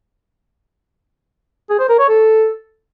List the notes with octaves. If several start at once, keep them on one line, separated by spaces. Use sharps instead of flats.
G#4
C5
A#4
C#5
A4